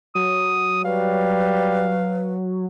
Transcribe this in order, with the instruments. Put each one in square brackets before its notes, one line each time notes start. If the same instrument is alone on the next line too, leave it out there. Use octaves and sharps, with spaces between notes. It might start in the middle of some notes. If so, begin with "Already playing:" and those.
[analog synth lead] F#3 [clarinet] D#6
[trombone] G3 [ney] B4 [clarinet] F5